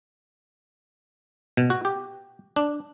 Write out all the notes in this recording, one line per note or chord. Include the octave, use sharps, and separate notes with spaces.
B2
F#4
G4
D4